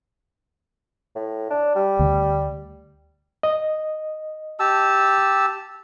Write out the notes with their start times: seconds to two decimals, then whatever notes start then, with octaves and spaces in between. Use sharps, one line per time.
1.15 A2
1.50 D4
1.76 G3
1.99 D2
3.43 D#5
4.60 G4 A5 E6